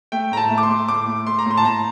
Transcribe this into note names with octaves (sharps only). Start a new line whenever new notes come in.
A3 G5
A2 A#5
A5
A3
D6
C6
A3
A2 D6
A3
A3 C6
A#5
A2 C6
A5
A2 A#5